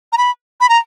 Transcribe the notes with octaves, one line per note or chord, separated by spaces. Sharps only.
A#5
B5
B5
A#5